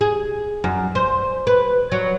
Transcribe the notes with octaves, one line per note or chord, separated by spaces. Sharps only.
G#4
F#2
C5
B4
F#3